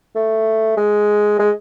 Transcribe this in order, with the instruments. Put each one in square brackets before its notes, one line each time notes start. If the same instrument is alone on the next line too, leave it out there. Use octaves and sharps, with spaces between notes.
[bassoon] A3
G#3
G#3